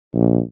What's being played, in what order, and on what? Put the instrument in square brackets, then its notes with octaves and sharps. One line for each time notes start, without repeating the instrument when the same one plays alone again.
[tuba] A#1